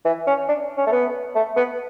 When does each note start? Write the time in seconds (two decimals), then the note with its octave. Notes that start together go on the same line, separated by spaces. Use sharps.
0.05 E3
0.27 C#4
0.49 D4
0.77 C#4
0.86 A3
0.92 B3
1.35 A3
1.56 B3